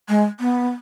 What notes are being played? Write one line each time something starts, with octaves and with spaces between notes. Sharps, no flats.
G#3
B3